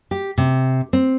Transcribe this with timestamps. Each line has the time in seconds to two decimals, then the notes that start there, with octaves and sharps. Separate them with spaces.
0.11 G4
0.38 C3
0.93 C4